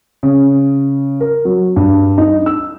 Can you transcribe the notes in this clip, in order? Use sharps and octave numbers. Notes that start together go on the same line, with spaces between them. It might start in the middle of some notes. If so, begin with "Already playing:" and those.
C#3
A#4
F#3
G2
D#4
E6